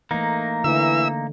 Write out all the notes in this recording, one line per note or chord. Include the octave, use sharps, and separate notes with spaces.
E3 A3 A#3 D#4
D3 E3 A3 E5 E6